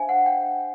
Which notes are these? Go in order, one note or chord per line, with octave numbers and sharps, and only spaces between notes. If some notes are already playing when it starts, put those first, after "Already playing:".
Already playing: D4 C5 E5 F5 G#5
F#5
G5